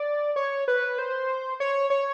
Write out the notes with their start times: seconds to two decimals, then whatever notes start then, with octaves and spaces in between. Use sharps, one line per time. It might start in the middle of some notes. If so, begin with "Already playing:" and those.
Already playing: D5
0.36 C#5
0.68 B4
0.98 C5
1.60 C#5
1.90 C#5